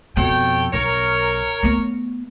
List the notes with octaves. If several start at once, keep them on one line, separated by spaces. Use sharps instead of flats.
F2 B2 A4 C#5 G5
B1 A#4 C#5
A3 B3